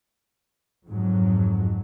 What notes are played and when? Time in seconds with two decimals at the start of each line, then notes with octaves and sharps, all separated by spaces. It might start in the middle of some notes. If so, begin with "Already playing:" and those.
0.87 F2 G#2 F#3